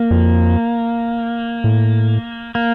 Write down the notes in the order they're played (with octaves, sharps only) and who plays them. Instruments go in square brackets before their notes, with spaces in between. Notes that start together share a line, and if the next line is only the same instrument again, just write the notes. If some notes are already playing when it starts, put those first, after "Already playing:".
Already playing: [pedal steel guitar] A#3
[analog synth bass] F2
A2
[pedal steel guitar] A#3